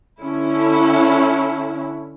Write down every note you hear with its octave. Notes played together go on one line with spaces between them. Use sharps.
D3 C#4 E4